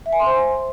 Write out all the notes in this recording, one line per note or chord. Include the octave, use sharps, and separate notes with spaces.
E5
G#5
C6
C5